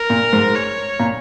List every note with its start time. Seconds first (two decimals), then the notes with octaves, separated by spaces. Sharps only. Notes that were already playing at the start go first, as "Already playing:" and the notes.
Already playing: A#4
0.10 A#2
0.33 G#2
0.55 C#5
1.00 A#2